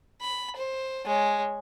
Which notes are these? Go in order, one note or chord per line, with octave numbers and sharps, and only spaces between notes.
B5
C5
G#3 C#5